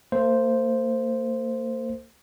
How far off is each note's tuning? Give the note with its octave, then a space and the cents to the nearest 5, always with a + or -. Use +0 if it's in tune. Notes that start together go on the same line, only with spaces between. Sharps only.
A#3 -40 C5 +0